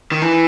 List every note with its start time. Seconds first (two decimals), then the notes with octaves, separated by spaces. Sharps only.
0.12 D#3
0.22 E3